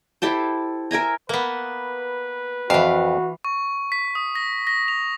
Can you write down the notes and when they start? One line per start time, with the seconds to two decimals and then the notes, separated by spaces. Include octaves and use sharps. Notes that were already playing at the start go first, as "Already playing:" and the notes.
0.22 E4 G4 A4 C5
0.91 A#4 E5 G#5 A#5
1.29 A#3 B3 B4
2.70 F2 E3 F#4 F5
3.45 C#6
3.92 B6
4.15 D#6
4.35 A#6
4.67 A#6
4.88 F7